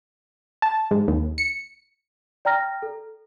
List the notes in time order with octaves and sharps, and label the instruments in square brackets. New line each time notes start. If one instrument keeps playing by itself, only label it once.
[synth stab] A5
G#2
D#2
C#7
[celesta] D5 G5 A#5 F6 A#6
A4